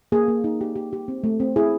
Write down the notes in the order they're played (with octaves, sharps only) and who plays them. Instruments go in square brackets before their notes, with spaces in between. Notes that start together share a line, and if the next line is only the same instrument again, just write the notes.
[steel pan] A#3 G#4
A#3
D#4
G4
G4
G4
C4
A3
C4
E4 G#4